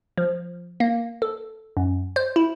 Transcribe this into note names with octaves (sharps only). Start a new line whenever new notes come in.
F3
A#3
A4
F#2
C5
E4